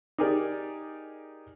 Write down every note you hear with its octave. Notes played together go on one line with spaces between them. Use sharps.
D#4 G4 G#4 A#4 D5